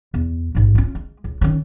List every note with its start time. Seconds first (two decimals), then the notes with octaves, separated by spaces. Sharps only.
0.14 E2
0.55 A1 G#2
0.75 C#4 F4
0.95 G#3
1.24 C#2
1.41 D#3 C#4